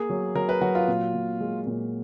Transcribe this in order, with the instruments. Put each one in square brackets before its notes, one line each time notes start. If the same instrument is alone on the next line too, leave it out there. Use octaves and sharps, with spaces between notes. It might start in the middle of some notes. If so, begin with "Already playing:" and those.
Already playing: [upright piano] A#3 [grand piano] G#4
[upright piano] F#3
[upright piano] F#3 [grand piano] A#4
[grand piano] B4
[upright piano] F#3 [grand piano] F#4
[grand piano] F4
[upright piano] A#2
A#2
G#3
A#2